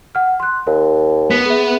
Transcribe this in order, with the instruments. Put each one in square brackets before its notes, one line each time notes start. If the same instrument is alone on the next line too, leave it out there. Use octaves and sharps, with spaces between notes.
[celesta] F#5 F6
C6 F#6
[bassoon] D#2 [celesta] A#4
[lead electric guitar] B3 [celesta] B6
[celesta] G#4 E5